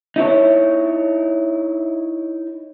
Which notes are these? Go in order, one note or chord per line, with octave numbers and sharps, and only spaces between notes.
D#4 E4 A4 C#5